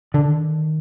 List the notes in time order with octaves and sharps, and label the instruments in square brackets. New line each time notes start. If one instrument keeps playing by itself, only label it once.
[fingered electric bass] D3 [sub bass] D#3